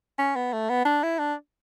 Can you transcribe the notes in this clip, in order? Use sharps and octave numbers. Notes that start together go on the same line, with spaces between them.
C#4
B3
A3
B3
D4
E4
D4